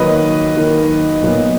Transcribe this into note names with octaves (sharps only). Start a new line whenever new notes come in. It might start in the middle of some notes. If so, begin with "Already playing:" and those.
Already playing: D#3 F#3 A#3 B4 D#5
D#3 F#3 A#3
A#2 F#3 B3